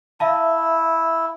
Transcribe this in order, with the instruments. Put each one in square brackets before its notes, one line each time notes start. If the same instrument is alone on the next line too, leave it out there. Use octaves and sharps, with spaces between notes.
[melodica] E4 [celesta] E5 F5 A5